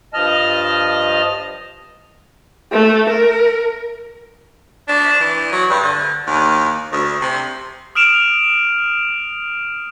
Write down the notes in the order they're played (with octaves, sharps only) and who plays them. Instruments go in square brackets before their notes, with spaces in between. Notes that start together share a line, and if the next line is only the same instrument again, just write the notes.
[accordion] G2 F3 D#5 A5 F6
[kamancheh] A3
A#4
[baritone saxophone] D4
E3
F#3
G2
D3
D#2
D2
C3
[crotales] D#6 F6 D7 E7 F7